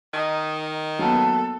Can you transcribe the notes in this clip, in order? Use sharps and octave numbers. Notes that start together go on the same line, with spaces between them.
D#3 D#4
F#3 A#3 B3 A4